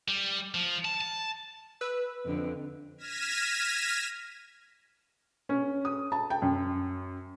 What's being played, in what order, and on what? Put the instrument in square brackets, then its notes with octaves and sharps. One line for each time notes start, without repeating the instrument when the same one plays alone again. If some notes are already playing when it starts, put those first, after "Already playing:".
[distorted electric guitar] G3
F3
A5
A5
[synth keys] B4 E6
[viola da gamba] F2 D3
[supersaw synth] F6 G#6 A#6 B6 D#7 E7
[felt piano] C#4
D#6
A5
G5
F#2